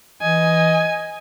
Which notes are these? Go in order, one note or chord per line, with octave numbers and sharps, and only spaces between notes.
E3 D#5 G#5